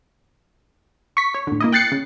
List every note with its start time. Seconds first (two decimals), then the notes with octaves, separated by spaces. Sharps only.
1.17 C#6 B6
1.34 C#5
1.47 A2 D3
1.60 A#3 E4 D#5
1.72 G5 F#6 A6 C7 C#7
1.92 C#3